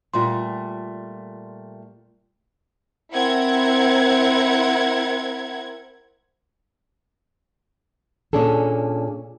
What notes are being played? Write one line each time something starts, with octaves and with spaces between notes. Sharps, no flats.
A#2 G3 A3 F4 C6
C4 E4 A#4 F#5 G#6
A#2 C#4 D4 G#4 A4